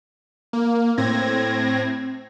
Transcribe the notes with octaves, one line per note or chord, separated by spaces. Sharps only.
A#3
A2 C4 G#6 A#6